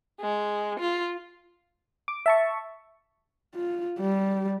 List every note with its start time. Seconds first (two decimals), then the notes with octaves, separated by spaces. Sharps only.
0.20 G#3
0.80 F4
2.08 D6
2.26 E5 A5 C#6
3.55 F4
3.99 G3